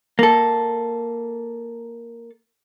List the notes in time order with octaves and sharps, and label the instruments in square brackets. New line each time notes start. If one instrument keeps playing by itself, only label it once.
[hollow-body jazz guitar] A#3 A4